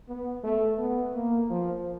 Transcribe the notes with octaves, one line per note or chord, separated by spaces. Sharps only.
B3
A3
B3
A#3
F3